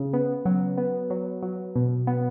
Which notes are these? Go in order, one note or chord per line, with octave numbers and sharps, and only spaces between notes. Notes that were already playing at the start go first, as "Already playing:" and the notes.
Already playing: C#3
B3
F#3
B3
F#3
F#3
B2
B3